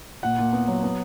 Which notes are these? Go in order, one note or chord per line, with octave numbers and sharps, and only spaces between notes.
A#2 F#5
A#2
B3
F#3
B3